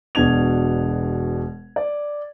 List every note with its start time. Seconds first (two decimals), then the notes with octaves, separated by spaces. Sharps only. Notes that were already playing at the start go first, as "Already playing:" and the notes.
0.15 E1 B2 D4 G#6 F7
1.76 D5